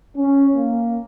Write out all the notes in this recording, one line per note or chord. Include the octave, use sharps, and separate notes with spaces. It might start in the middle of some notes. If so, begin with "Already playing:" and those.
C#4
A#3